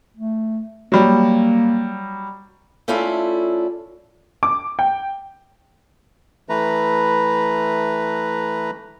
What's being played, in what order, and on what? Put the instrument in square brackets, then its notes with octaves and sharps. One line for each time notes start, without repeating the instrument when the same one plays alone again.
[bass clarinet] A3
[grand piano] F#3 G3 [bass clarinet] A#3
[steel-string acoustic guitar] A3 C#4 E4 F4 A4 D5
[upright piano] D6
G5
[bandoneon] E3 A3 B4 A#5